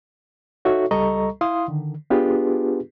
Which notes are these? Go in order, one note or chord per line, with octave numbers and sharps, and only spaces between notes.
D#4 F#4 A4 C#5 E5 C#6
C#2 G3 A4 D#5 A#5 C#6
E4 F5 C6 D#6
D3 D#3
B3 D4 F4 G4 G#4 B4